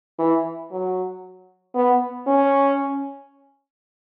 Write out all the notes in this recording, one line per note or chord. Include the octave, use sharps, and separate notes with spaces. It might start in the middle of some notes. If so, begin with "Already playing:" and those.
E3
F#3
B3
C#4